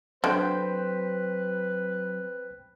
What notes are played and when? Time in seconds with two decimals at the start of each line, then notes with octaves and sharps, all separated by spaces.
0.24 D3 F#3 C4 B4 C5 G5